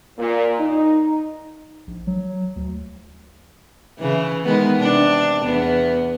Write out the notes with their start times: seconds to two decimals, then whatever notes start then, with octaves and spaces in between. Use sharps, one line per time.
0.18 A#2
0.60 D#4
1.87 A#1
2.07 F#3
2.56 D2
3.99 C#3 E3
4.45 D#3 G#3 B3
4.77 C3 D4
5.42 E2 B3